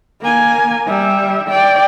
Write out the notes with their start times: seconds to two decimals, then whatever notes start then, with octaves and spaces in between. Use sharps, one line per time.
0.22 A#3 G#5
0.87 G3 E5
1.48 D5 G5